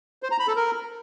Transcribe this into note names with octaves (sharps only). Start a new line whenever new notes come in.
C5
A#5
B5
A4
A#4